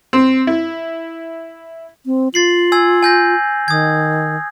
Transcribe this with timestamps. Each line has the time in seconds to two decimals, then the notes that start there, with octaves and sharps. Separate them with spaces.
0.13 C4
0.47 E4
2.06 C4
2.34 F4 A6 C7 F#7
2.72 G#5 E6 G#6
3.02 G#5 G6 A#6
3.68 D#3 D#6 G#6